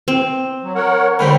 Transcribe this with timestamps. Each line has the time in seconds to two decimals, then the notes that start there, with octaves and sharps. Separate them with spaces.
0.08 C4
0.64 F#3
0.75 A#4 C#5 F#5
1.19 D2 G#2 D3 C5 G5 B5